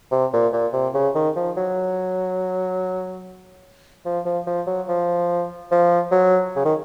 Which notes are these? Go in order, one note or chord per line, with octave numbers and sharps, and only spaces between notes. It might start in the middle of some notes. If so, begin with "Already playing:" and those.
C3
A#2
A#2
C3
C#3
D#3
F3
F#3
F3
F3
F3
F#3
F3
F3
F#3
C#3
D#3